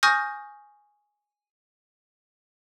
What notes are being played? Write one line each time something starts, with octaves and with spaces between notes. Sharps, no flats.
G#5 C#6 D#6 F6 G6 A#6